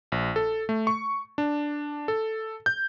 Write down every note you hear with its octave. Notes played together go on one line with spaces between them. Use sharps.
A#1
A4
A3
C#6
D4
A4
G6